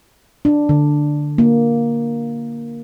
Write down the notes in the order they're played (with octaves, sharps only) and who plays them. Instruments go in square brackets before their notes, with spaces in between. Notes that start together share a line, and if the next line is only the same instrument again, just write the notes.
[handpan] D4
D3
A#3